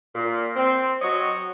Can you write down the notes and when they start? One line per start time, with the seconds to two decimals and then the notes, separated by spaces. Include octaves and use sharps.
0.15 A#2
0.56 C4
1.02 F#3 F#4 C#5 D#5